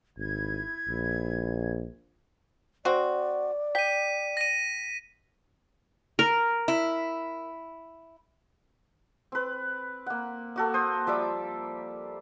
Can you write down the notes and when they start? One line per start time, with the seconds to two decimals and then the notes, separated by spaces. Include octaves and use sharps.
0.17 G#1 E4 G#6
0.88 A#1
2.85 C4 F#4 D5
3.75 G5 B6 D#7
4.37 A#6 D#7
6.19 A#4
6.68 E4
9.32 C4 B4
10.06 A#3 F#5
10.56 A#3 F#4 A4
10.74 C5 D#6
11.07 F3 G3 E5 D6